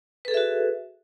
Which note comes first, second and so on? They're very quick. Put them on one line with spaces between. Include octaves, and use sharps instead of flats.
B4 A4 G#4 E5 F#4